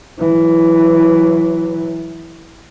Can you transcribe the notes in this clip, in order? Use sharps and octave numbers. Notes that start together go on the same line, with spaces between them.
E3 F#3